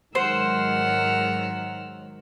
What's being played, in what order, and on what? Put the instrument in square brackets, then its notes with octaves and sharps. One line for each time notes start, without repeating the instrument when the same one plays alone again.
[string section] G#2 D#3 F#3 [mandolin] C5 [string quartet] F#5 E6 F6